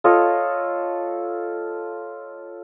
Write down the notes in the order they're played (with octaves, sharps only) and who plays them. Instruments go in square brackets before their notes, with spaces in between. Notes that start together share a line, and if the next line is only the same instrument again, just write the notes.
[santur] F4 A4 C#5 D#5